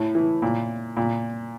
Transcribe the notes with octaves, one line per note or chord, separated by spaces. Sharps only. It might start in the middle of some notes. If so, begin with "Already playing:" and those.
Already playing: A2
E3
A#2
A#2